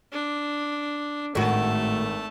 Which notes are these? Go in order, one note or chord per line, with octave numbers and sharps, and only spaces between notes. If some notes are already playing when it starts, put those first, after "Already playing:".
D4
G#1 A2 A3 F#4 A5